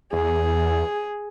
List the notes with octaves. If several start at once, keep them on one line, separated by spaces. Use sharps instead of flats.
E2 G#4